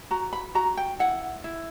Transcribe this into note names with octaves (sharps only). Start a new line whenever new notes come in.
F#4 A#5
B5
F#4 A#5
G5
E4 F#5
E4